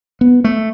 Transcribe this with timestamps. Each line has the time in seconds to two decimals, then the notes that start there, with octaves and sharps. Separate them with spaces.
0.21 B3
0.44 A3